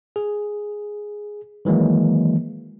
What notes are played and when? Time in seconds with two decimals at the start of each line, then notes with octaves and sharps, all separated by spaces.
0.16 G#4
1.65 D#3 E3 F#3 G#3 A#3